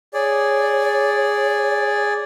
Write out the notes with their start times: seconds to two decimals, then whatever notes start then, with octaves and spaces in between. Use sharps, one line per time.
0.14 G#4 C#5 D5